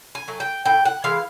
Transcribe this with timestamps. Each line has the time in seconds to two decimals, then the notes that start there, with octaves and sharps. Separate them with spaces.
0.15 G#5
0.28 F#3 A3
0.40 G5
0.65 A2 G5
0.85 F#5
1.04 E3 G#3 F5